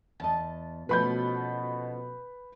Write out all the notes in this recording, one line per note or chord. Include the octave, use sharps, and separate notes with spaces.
E2 D#5 A5
B2 F3 A3 C#4 B4 B5 G6